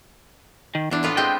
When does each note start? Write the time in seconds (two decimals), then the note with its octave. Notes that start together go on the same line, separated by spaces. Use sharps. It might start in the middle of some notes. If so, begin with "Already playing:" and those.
0.75 D#3
0.91 E2 E3 D4
1.03 A2 B3 F4
1.17 G#3 B3 C4 G5